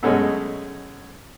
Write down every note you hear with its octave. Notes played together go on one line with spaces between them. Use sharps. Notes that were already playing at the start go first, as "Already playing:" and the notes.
F#2 B2 G#3 A3 C#4